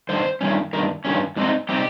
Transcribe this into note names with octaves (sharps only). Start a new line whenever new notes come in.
G2 D#3 C5
G2 D#3 G3 C#4
G2 D#3 A#4
G2 D#3 G3 C#4
G#2 G3 C4 D#4
G3 C4 D#4 G4